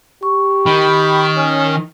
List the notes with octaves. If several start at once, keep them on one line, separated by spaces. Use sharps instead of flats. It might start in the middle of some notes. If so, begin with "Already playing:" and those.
G4 C#6
D#3 G5 B5
C#4